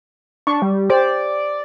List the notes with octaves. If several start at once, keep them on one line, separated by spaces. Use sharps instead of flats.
D4 C#6
G3
G4 C5 D5